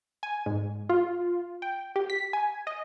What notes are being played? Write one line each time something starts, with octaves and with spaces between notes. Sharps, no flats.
G#5
G#2
F4
G5
G4
B6
G#5
D#5